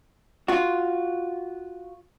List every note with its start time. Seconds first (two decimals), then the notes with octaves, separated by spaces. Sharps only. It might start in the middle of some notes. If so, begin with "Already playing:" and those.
0.48 F4 F#4